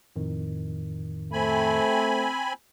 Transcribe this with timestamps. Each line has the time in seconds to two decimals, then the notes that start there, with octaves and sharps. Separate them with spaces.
0.16 F2 A2 D#3
1.33 A3 C4 G#5 B5